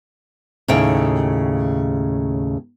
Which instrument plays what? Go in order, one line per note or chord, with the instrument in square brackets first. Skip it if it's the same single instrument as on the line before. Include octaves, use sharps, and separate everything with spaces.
[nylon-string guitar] D#2 A2 C#3 G5